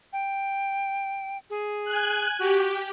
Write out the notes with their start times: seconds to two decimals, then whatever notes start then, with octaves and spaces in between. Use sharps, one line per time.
0.13 G5
1.50 G#4
1.85 G#5 F#6
2.39 F#4 G4